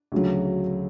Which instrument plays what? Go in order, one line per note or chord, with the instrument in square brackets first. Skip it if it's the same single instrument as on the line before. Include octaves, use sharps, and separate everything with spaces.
[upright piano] D2 C#3 F#3